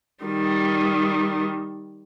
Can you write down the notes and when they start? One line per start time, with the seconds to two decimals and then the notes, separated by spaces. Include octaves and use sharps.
0.24 D#3 G3